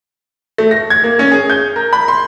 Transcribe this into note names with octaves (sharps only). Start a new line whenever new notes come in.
A3
A#6
G#6
A#3
C#4
G#4
G6
A#4
B5
C6